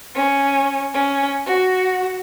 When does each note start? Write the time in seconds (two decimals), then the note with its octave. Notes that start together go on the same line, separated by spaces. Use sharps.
0.15 C#4
0.94 C#4
1.46 F#4